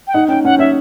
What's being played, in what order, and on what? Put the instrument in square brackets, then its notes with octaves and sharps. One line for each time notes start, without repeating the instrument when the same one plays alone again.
[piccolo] G5
[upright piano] D#4 [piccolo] F#5
[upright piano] C#4 [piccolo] G5
[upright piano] C#4 [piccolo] F#5
[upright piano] C#4 [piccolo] E5